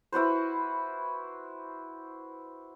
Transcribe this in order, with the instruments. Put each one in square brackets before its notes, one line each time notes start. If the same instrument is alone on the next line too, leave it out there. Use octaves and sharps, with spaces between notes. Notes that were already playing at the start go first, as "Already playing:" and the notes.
[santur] E4 F#4 B4 C5